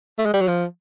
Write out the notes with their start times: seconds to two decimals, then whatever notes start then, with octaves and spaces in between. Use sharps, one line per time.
0.19 A3
0.26 G#3
0.33 G3
0.41 F#3
0.48 F3